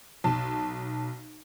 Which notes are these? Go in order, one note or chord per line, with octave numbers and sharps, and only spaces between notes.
B1 A5